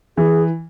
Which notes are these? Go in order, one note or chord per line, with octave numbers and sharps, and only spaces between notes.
E3 G#4